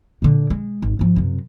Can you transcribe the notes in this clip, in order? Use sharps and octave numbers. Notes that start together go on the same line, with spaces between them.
A#2 D3
G#3
G#1
G#1 F3
F#2 C3